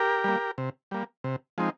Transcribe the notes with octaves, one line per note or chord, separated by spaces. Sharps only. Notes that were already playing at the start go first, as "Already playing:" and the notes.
Already playing: G4 A#4
G3 A#3
C3
G3 A#3
C3
F3 G#3 C4 D#4